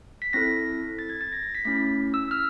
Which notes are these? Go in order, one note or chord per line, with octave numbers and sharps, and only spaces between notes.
B6
C4 E4 A4 A#6
A6
G#6
A6
A#6
A#6
B6
A3 C#4 E4 B6
E6
F6